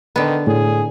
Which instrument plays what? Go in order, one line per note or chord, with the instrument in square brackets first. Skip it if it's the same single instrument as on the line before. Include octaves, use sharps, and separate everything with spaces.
[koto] D3 B3 [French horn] D#3
[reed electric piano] A2 [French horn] G#4